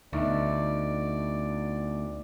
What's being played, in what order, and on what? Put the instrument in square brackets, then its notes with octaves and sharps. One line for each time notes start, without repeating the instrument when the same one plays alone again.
[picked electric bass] D2 [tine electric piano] B3 D#4 E5 [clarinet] D5